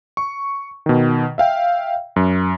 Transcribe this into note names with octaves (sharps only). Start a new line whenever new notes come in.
C#6
B2 D#3
E5 F5 G5
F#2